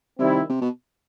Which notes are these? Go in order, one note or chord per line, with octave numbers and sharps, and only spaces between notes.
C3 D#3 G3 C4 E4
C3
B2